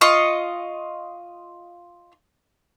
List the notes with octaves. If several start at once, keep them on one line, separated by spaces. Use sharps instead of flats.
F4 D#5 C#6